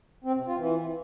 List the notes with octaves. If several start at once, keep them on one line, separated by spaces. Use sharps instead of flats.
C4
C3
F4
E3